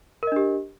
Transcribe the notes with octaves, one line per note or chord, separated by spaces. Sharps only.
D4 G4 A#4 D#5